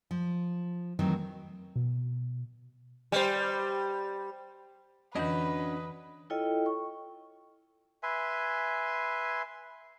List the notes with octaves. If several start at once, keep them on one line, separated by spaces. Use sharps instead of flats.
F3
D#3 E3 F#3 A3 C4
B2
G3 C5
F2 D3 E3 C#4 D4 F#4 B4 D#5
E4 F4 A4 C#5 D#5 G5
C#6
B4 E5 G#5 C6